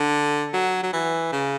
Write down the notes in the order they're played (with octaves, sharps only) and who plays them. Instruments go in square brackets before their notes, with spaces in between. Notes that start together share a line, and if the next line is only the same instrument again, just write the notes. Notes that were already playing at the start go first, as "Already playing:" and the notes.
Already playing: [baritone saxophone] D3
F#3
F#3
E3
C#3